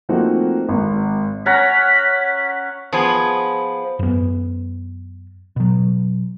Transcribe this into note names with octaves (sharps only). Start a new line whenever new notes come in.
F3 A3 A#3 C4 D#4 F#4
G#1
C#4 F#5 A#5 B6
F3 B3 G#4
F#2 B3
B2 F#3